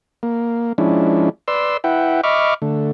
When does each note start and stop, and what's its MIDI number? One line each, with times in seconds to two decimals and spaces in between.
0.23 0.73 58
0.78 1.29 53
0.78 1.29 56
0.78 1.29 61
0.78 1.29 62
0.78 1.29 64
1.48 1.77 71
1.48 1.77 74
1.48 1.77 84
1.48 1.77 88
1.84 2.21 64
1.84 2.21 71
1.84 2.21 76
1.84 2.21 78
1.84 2.21 79
2.24 2.54 75
2.24 2.54 76
2.24 2.54 83
2.24 2.54 85
2.24 2.54 86
2.24 2.54 89
2.62 2.92 50
2.62 2.92 57